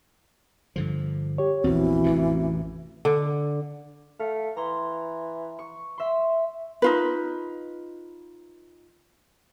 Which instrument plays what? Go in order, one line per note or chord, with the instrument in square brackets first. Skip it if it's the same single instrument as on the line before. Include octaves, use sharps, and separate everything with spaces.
[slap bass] G2 D3 F3
[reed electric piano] G4 C#5
[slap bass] A#1 E2 [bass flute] E3 [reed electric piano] C4 F#4
[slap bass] A1 F2 C3
[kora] D3
[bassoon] A3 [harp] F5
[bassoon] E3 [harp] A#5 C6
[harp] C#6
E5 C6
[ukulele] D#4 F4 B4